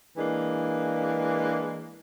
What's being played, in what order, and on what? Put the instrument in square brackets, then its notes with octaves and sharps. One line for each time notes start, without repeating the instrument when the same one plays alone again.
[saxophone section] E3 G#3 A#3 D4